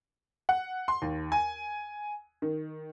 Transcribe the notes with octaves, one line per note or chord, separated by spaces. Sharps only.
F#5
C6
D#2
G#5
D#3